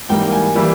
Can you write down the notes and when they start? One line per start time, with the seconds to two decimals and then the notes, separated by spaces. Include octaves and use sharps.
0.09 G#2 E3 G3 A#3 G5
0.32 G#5
0.55 E3 G3 A#3